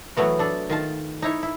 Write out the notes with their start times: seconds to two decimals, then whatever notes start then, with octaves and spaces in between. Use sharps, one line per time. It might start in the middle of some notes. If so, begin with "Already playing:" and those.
0.17 E3 F#3 A3 B3 F#4
0.39 D4 A4
0.70 D#3 F4 A5
1.22 D#4 E4 C#5
1.43 E4